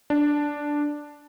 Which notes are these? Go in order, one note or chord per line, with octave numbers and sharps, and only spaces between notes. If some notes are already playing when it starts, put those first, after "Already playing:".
D4